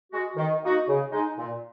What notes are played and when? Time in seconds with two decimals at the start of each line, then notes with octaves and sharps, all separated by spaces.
0.11 G#3 F#4
0.36 D#3
0.62 A#3 D#4 F#4
0.88 C#3
1.12 G#3 D#4
1.37 A#2